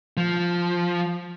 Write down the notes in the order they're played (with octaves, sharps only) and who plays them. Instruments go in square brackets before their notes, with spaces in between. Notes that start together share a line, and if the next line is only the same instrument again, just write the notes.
[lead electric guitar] F3